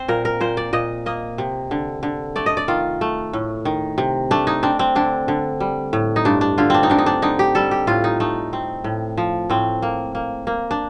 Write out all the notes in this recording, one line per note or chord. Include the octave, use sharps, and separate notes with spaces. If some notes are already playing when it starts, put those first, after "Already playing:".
Already playing: C4 C5
A#2 A#4
A#4
A#2 C5
D5
A#2 D#5
A#3 D#5
C3
D3
D3
A3 D5
D#5
D5
D#3 F4
A3
A2
D#3
C3
A3 D4
D#4
C4 D4
C4
D3 D4
D3
G3
A2
D#4
G2 D4
D4
D3 F4
C4 D4
D#4
D3 D4
D#4
D4
D3 D#4
G4
G3 A4
G4
A2 F4
D#4
A3 D#4
C4
A2
F3
A2 C4
A#3
A#3
A#3
D4